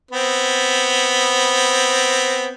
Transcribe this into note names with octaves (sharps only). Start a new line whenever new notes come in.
B3 C4